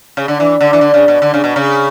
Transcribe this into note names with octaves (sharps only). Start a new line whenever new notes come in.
C#3
D3
E3
D3
E3
D3
C#3
B2
D3
C#3
B2
C#3